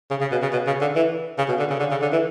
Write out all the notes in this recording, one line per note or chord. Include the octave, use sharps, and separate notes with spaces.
C#3
C#3
B2
C#3
B2
C#3
D3
E3
C#3
B2
D3
C#3
D3
C#3
D3
E3